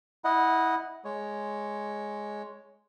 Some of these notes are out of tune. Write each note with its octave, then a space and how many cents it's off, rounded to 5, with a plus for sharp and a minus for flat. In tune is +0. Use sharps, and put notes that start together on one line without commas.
E4 -20 D#5 +0 F#5 +0
G#3 +5 C#5 +0